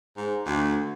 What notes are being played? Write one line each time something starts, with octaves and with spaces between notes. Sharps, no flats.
G#2
D2